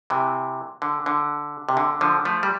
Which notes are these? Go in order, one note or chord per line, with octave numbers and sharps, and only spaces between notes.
C3 E3
D3
D3
C3
D3
D3 F3
F3 A3
G3